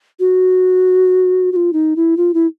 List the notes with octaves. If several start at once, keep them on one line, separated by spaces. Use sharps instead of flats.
F#4
F#4
F4
D#4
E4
F4
E4